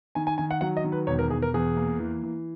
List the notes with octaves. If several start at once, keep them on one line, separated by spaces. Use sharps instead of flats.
D#3 G#5
G#5
D#3 G#5
F#5
F#3 F#5
D#5
D#3
B4
E1 C#5
A#4
E1 G#4
A#4
E2 G#4
A#3
E3
E3